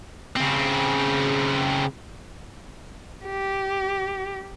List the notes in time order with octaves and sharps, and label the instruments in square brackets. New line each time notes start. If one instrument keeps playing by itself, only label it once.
[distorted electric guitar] C#3 C4
[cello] G4